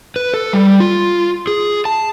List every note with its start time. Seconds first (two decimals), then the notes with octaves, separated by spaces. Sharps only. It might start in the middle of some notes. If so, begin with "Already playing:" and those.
0.16 B4
0.34 A4
0.53 G3
0.80 F4
1.47 G#4
1.85 A5